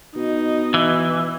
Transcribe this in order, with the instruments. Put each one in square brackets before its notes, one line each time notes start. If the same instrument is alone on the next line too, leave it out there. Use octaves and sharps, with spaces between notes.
[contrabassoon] B2 [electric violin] D#4
[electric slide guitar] E3